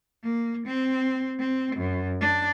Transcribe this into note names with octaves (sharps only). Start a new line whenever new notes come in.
A#3
C4
C4
F#2
D4